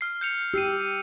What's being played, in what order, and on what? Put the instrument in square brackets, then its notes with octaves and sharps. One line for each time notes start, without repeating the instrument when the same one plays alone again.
[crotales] F6 C7
G6 C#7 F7
[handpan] G4 [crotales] E6 C7 D#7